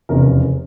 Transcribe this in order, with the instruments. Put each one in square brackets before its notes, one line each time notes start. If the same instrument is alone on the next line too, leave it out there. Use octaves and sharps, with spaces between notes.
[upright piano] F1 E2 C#3 A#4